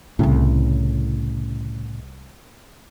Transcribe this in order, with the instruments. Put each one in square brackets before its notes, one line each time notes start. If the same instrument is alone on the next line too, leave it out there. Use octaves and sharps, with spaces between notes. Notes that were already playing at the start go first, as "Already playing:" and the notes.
[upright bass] C2 E4 [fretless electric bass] A2 C#3 C#4